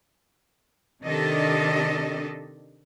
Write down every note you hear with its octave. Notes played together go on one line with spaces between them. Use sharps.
C3 D#3 D4 G4 A4 D#5